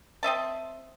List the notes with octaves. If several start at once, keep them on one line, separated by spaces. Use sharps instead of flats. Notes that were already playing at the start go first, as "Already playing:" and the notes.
C4 D#5 E5 A5